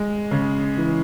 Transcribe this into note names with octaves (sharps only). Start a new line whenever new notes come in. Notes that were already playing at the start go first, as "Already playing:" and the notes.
Already playing: G#3
C#3
E3